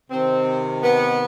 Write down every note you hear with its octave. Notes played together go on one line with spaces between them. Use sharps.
C3 D#3 C4
B3